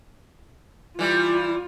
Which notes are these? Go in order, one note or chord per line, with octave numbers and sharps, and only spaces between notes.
E3 G3 F4